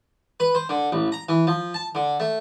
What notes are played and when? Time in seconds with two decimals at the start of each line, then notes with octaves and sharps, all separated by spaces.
0.40 B4
0.55 C5
0.69 D3
0.92 A1
1.12 A#5
1.29 E3
1.47 F3
1.74 A5
1.95 D3
2.20 A3